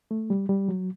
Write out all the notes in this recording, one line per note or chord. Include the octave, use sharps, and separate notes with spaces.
A3
G3
G3
F#3